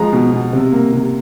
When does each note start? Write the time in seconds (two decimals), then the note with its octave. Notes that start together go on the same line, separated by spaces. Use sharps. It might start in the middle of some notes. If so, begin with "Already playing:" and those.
Already playing: F3 G#3 A#5
0.13 B2
0.33 B2
0.53 C3
0.72 A#3
0.93 C3